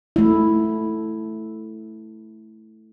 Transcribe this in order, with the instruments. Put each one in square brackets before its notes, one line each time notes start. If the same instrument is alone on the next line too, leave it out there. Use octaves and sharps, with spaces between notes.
[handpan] A3 E4